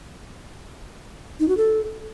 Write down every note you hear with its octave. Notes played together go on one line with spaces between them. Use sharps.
D#4
F#4
A4